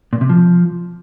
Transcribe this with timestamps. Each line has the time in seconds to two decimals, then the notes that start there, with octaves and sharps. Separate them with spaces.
0.13 A#2
0.21 C3
0.29 F3